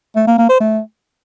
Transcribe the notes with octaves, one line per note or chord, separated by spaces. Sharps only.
A3
A#3
A#3
C5
A3